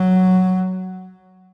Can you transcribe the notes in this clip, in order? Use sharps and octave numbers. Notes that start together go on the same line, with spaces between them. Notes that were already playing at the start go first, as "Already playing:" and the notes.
Already playing: F#3